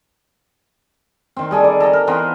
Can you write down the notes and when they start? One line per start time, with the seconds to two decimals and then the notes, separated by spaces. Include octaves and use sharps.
1.36 D#3 C4
1.51 G3 G#4 A4
1.64 D5
1.80 A4 D#5 A#5
1.93 A#4
2.07 E3 B3 C4